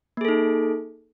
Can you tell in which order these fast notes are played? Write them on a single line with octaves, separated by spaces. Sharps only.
A#3 G#4 A4 D#4